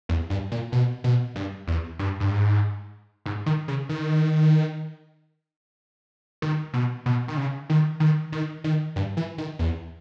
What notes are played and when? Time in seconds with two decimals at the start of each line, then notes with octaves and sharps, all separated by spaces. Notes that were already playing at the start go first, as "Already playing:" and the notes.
0.09 E2
0.30 G2
0.52 A#2
0.72 B2
1.04 B2
1.35 G2
1.67 E2
1.99 G2
2.20 G2
2.31 G#2
3.26 G#2
3.46 D#3
3.68 C#3
3.89 D#3
6.42 D#3
6.73 B2
7.06 B2
7.28 D#3
7.37 C#3
7.70 D#3
8.00 D#3
8.32 D#3
8.64 D#3
8.96 G2
9.17 E3
9.38 D#3
9.59 E2